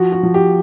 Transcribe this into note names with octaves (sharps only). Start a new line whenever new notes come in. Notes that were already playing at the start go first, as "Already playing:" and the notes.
Already playing: F3 F#4
F#4
F3
G4